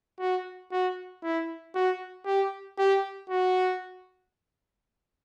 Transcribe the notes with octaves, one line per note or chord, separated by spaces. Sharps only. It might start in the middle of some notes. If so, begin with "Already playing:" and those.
F#4
F#4
E4
F#4
G4
G4
F#4